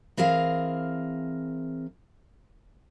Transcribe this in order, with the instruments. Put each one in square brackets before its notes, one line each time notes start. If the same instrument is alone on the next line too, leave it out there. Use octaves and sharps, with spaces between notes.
[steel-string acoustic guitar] E3 C4 G#4 A#4 F5